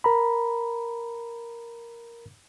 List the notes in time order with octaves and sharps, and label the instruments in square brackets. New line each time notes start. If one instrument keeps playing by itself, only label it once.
[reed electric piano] A#4 A#5 B5